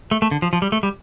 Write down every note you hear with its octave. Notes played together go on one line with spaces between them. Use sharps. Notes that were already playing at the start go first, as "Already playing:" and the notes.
A3
A3
D3
F3
F3
G3
A3
G3